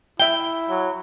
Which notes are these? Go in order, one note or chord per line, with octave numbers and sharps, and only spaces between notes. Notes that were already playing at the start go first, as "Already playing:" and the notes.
E4 E5 G5 G7
F#3